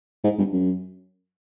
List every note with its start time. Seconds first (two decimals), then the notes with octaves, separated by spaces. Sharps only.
0.24 G#2
0.39 G2
0.53 F#2